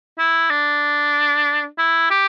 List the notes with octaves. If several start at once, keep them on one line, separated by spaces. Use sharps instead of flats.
E4
D4
E4
G4